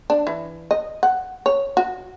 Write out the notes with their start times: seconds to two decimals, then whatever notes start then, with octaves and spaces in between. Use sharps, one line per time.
0.10 D4
0.27 E3
0.71 D#5
1.03 F#5
1.46 C#5
1.77 F#4